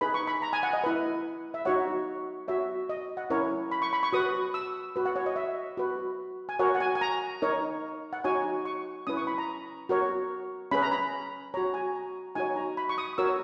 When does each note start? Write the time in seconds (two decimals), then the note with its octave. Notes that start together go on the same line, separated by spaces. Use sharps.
0.01 D#4 G#4 B4 B5
0.14 C#6
0.27 B5
0.42 A#5
0.53 G#5
0.63 F#5
0.73 D#5
0.84 E4 B4
1.54 E5
1.65 D#4 F#4 C#5 F#5
2.48 F#4 C#5 E5
2.89 D#5
3.17 F#5
3.30 C#4 E4 A#4 C#5
3.71 B5
3.82 C#6
3.93 B5
4.03 C#6
4.13 F#4 B4 D#6
4.54 E6
4.96 F#4 B4
5.05 F#5
5.16 C#5
5.26 D#5
5.36 E5
5.77 F#4 B4
6.49 G#5
6.59 F#4 A#4 C#5 F#5
6.75 F#5
6.81 G#5
6.95 G#5
7.01 A#5
7.42 D#4 A#4 C#5
8.13 F#5
8.24 D#4 F#4 C#5 G#5
8.65 C#6
9.07 C#4 E4 B4 D#6
9.17 C#6
9.27 B5
9.38 A#5
9.89 F#4 A#4 C#5
10.71 C#4 G#4 B4 B5
10.82 A#5
10.92 B5
11.54 F#4 C#5 A#5
11.74 G#5
11.95 A#5
12.35 D#4 F#4 C#5 G#5
12.56 A#5
12.77 B5
12.89 C#6
12.98 D#6
13.18 F#4 A#4 C#5 E6